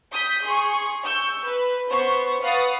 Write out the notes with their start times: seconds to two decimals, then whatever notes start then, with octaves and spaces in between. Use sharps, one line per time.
0.12 D#6 G6 B6
0.43 G#4 C6 C#6
1.03 C#6 E6 G6
1.45 B4
1.89 B3 C5 C#6
2.42 B4 F5 F#5 C#6 D#6 A6